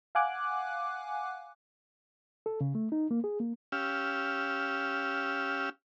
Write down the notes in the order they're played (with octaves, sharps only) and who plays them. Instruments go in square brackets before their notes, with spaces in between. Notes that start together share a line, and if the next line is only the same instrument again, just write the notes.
[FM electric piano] F5 F#5 G#5 D6 F#6
[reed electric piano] A4
C#3
A3
D#4
A#3
G#4
A#3
[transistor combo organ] C#4 G4 F5 E6